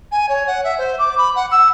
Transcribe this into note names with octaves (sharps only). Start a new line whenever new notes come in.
G#5
C#5
F#5
E5
C5
D6
B5
F#5
E6